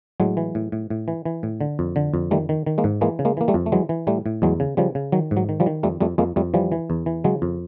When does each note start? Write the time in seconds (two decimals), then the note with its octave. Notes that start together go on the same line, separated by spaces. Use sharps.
0.20 A2 F#3 G#3
0.37 E3
0.55 A2
0.72 A2
0.90 A2
1.08 E3
1.25 E3
1.43 A2
1.61 D3
1.79 F2
1.96 D3
2.14 F2
2.31 D#3 G3 A3
2.49 D#3
2.66 D#3
2.78 G#3 A#3
2.84 G#2
3.01 E3 G#3 A#3
3.19 C#3
3.25 G#3 A#3
3.37 E3 A#3
3.48 G3 A3
3.54 F2
3.66 A3
3.72 E3 F#3 G#3
3.89 E3
4.07 A2 G3 A3
4.26 A2
4.42 E2 F#3 G#3
4.60 C#3
4.77 C#3 F3 G3
4.95 C#3
5.12 D#3 F#3
5.31 G#2
5.37 F#3
5.49 D#3
5.60 F3 G3
5.66 D#3
5.83 F2 G3 A3
6.00 F2 G3 A3
6.18 F2 G#3 A#3
6.36 F2 G3 A3
6.54 E3 F3 G3
6.72 E3
6.90 E2
7.06 E3
7.24 C#3 F#3 G#3
7.42 F2